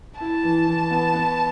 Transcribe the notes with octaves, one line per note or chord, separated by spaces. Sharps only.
E4 A5
E3
E3
B3
B3